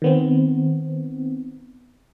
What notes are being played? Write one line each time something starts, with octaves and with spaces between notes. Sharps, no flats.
D#3 B3 C4